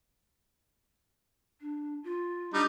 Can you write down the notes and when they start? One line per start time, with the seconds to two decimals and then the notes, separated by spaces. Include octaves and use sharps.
1.61 D4
2.04 F4
2.54 G3 D4 D#4